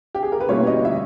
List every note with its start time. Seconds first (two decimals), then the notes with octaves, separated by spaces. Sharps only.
0.15 G4
0.23 G#4
0.32 A#4
0.40 B4
0.49 B2 G3 A#3 C#4 E4 C#5
0.67 D#5
0.85 E5